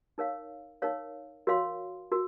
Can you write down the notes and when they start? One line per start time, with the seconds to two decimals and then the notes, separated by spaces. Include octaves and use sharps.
0.18 D#4 A#4 C#5 F5
0.82 D#4 A#4 C#5 F5
1.47 F#4 A#4 C#5 F5 C6
2.12 F#4 A#4